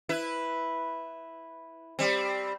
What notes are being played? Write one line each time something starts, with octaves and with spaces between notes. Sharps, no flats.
E4 B4
G3 C4